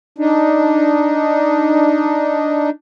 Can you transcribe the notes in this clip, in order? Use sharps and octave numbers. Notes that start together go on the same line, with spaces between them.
D4 D#4